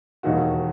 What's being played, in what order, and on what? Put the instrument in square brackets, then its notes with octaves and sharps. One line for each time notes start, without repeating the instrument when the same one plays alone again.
[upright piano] E1 D#2 D#3 F#4